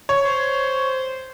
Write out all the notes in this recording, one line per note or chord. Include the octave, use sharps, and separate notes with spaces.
C#5
C5